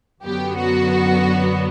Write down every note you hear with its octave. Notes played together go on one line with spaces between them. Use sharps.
F#2 D3 F#3 B3 G4
F#4